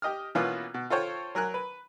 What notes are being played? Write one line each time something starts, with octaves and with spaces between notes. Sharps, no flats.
G4 D#5 D#6 F6
B2 E3 A#3 B3 C#4 F4
B2
F4 A4 C5 C#5 G5
F#3 A#4 G#5 F#6
B4